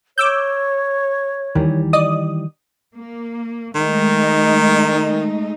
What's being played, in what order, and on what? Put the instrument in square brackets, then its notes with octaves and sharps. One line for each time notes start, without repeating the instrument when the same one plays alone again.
[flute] C#5 [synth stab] D6 E6 G6
[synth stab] D#2 [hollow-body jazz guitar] D#3 E3 G3
[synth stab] D5 D#5 D#6
[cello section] A#3
[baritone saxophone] D#3 [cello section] G#3 A3 D#4